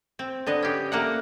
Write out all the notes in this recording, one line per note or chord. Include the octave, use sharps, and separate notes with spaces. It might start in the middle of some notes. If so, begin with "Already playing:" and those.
C4
D3 B3 D#5
C#4 G4
A3 A#3 A#4 F#5